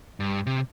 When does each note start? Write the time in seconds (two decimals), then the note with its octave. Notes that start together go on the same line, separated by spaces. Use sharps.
0.20 G2
0.47 C3